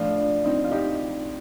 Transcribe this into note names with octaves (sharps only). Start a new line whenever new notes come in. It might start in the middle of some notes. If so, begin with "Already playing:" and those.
Already playing: A2 F3 D4 F4
D4
C4 D#4
F4
D#4 G4